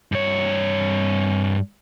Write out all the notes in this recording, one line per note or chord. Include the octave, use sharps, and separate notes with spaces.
G2 C#5